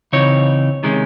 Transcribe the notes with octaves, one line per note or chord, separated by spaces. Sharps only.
C#3 E3 C4 D#4 C#5
C3 D#3 G#3 C#4